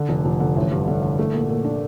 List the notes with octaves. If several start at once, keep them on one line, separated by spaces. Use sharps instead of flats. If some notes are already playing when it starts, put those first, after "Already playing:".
Already playing: D3
F1
F1
D3
A1
G2
D3
D3
A3
A#2
A#2
D4